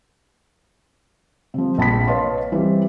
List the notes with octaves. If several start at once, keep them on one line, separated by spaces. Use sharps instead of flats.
C3 F3
A#1 A5 B5 B6
B4 C#5 D#5 F5 A5 C6
E3 G3 C4